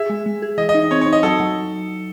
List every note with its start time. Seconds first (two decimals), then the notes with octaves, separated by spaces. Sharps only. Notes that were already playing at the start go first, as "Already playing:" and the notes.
Already playing: G#4 E5
0.10 G#3
0.26 G#3
0.42 G#4
0.58 E3 D#5
0.69 D#5
0.74 D#4
0.91 C4 C#5
1.01 C#5
1.07 D#4
1.13 D#5
1.23 F#3 A4
1.40 F#3